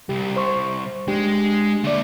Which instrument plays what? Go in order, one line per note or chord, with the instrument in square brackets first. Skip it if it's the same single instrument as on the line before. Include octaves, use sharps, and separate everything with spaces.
[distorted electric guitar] C2 [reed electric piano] G4
[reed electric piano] C5 C#6
[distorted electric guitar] G#3 [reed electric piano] D4 G4
[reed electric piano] D3 D5 [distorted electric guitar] A#3 E5